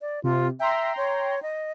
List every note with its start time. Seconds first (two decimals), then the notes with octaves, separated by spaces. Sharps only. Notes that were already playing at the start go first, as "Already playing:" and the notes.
0.01 D5
0.24 C3 F4
0.60 E5 G5 A#5 C6
0.97 C#5
1.43 D#5